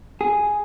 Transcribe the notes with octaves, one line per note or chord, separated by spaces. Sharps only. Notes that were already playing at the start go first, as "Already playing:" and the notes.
G#4